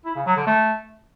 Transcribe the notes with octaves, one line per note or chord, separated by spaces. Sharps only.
E4
C#3
F#3
D3
A3